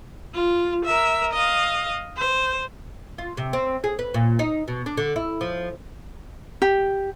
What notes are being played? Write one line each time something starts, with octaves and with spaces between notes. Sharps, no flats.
F4
A#4 E5
D#5 F5
C5
F4
C3
C4
G#4
B4
A#2
D#4
B2
D4
D3
E4
F3
G4